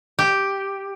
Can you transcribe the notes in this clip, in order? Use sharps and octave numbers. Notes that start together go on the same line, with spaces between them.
G4